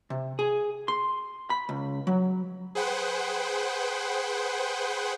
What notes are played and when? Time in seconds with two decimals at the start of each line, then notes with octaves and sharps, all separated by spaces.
0.10 C3
0.39 G#4
0.88 C6
1.50 B5
1.69 C#2
2.07 F#3
2.75 G#4 B4 C5 F#5 G5